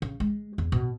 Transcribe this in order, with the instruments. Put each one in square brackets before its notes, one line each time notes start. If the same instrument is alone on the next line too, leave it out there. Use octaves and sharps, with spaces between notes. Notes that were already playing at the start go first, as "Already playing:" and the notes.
[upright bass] C#3
G#3
E2
B2